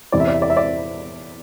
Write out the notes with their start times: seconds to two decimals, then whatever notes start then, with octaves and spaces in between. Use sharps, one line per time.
0.12 E2 C3 E3 D5
0.20 E5
0.28 D5
0.34 E5
0.42 D5
0.50 E5
0.57 D5